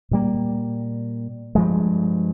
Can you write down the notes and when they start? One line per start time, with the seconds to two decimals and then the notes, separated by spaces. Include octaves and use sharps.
0.11 A#2 G3 A#3
1.55 G2 F3 G#3